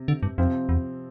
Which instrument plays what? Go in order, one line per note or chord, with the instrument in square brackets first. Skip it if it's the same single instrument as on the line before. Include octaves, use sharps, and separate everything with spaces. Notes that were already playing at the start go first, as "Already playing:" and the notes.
Already playing: [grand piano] C3
[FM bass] D3
G2
[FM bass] F2 [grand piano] C3 F3 C4
[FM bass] E2